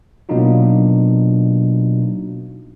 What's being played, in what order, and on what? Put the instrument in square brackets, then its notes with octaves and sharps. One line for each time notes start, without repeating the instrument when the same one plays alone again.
[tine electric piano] B2 F#3 A#3 D4 D#4 F4